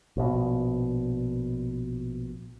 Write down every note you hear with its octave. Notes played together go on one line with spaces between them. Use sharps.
A#1 B2